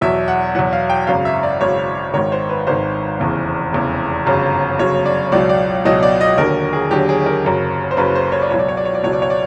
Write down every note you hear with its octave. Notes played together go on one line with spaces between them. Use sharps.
E2 B2 F#3 E5
F#5
E2 B2 F#3 F#5
F5
G5
G#1 F#2 C#3 F5
E5
D5
G#1 F#2 C#3 C#5
G#1 G#2 D#3 C#5
C5
B4
G#1 G#2 D#3 C5
F1 E2 C#3 E3
F1 E2 C#3 E3
G1 F#2 C#3 F#3
G1 F#2 C#3 F#3 C#5
D5
C#2 B2 F#3 D5
D5
C#2 B2 F#3 D#5
D5
D#5
D#2 D3 F#3 A#4
G#4
D#2 D3 F#3 G4
G#4
A#4
F#1 F#2 C#3
C5
F#1 F#2 C#3 B4
C5
C#5
D5
C#2 B2 F#3 C#5
D5
C#5
D5
C#5
D5
C#2 B2 F#3 C#5
D5
C#5
D5